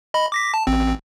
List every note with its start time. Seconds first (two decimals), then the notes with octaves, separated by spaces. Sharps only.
0.14 D#5 B5
0.32 D6 A#6 B6
0.54 A5
0.67 A1 C4